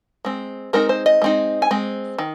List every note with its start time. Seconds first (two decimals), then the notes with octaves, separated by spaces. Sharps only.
0.25 G#3 C4
0.73 G#3 C4 D#4 A#4
0.89 C5
1.06 D#5
1.22 G#3 C4 D#4
1.62 G#5
1.71 G#3 C4
2.19 D#3